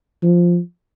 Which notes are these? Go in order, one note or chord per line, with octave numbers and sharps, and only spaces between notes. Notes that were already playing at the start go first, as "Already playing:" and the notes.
F3